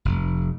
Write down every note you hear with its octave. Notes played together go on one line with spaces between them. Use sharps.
F1